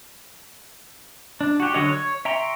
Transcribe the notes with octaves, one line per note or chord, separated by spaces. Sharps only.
D4
F#4 G4
D3 F#3 D4 C#5 D#5
C#5
E5 G5 A#5 C6 C#6